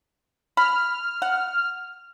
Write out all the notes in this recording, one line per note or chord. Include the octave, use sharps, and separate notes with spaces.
B5 F6
F#5